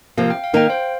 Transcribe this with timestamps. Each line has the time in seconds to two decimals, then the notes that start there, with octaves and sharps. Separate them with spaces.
0.17 C3 F3 A#3 F5
0.30 G5
0.44 F5
0.53 D#3 A#3 D#4 A#4 G5
0.70 C5 F5